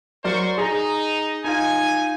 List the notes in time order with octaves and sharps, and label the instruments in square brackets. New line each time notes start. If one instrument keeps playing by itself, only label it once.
[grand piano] F#3 A#4 D5 [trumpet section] C5 C#6
[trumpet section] D#4 [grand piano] G#4 A#5
[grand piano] D#4 F4 [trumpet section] G#5